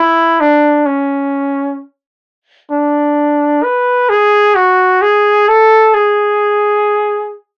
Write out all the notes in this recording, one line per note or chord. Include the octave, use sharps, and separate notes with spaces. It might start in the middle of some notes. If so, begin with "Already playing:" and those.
Already playing: E4
D4
C#4
D4
B4
G#4
F#4
G#4
A4
G#4